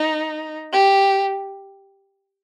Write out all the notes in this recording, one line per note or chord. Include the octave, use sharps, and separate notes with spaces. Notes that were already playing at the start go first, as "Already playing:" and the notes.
Already playing: D#4
G4